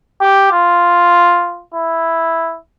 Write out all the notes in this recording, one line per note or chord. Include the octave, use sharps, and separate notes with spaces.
G4
F4
E4